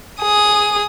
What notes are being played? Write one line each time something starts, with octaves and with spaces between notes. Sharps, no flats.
G#4 D#6